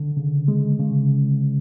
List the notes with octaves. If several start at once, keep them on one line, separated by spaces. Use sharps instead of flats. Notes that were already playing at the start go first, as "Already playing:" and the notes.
Already playing: D3
C#3
G#3
C#3